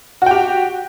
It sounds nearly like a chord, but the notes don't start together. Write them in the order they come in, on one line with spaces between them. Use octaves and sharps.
F#4 G5 G4